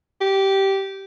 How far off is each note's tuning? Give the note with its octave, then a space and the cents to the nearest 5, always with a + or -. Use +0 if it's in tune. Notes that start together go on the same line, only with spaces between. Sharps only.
G4 -10